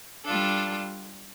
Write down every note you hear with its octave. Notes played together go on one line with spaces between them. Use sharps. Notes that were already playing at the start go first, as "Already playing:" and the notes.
G3 D4 F4 A4